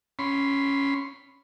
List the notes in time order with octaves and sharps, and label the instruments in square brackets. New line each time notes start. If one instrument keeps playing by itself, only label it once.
[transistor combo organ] C#4 B5 C6